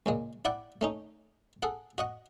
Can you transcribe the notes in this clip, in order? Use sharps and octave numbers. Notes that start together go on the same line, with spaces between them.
C#2 A#2 G#3
E4 D5 F#5 G5
A3 C#4 D#4
G#4 A4 F#5
F#4 D#5 F#5